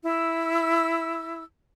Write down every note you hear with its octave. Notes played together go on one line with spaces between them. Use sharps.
E4 E6